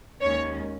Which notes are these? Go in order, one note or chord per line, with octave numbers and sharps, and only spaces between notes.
D#2 D#3 G#3 C#4 C#5